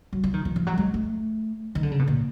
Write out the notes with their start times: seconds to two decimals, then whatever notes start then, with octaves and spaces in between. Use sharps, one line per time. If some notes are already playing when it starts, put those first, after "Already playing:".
0.13 F#3
0.24 F3
0.34 D#3
0.45 F3
0.56 F3
0.67 F#3
0.77 G#3
0.94 A3
1.75 D#3
1.83 D3
1.91 C#3
1.99 B2
2.08 A#2